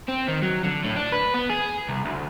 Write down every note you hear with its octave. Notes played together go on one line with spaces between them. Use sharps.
C4
D#3
F#3
D3
A2
D4
B4
B3
G#4
C2
D2